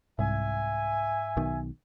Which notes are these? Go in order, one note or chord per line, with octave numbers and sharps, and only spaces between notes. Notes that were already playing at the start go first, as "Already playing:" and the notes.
C2 G#2 E5 G#5
B1 B2 D#3